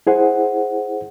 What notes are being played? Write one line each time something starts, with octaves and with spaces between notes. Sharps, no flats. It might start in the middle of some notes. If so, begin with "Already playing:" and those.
E4 G#4 C5 F#5